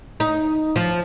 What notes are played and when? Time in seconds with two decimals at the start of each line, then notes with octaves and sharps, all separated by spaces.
0.20 D#4
0.76 F3